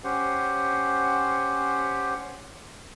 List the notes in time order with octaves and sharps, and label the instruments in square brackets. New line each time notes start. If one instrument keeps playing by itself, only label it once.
[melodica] C#4 G4 C5 F#5